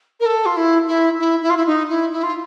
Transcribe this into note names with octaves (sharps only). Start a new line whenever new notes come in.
A#4
A4
F4
E4
E4
E4
E4
F4
E4
D#4
E4
E4
F4